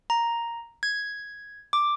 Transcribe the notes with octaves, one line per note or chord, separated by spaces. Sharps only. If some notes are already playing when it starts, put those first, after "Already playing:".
A#5
G#6
D6